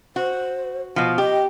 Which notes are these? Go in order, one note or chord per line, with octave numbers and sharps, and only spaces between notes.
F#4 C5
B2 F3 F#5
G4 D#5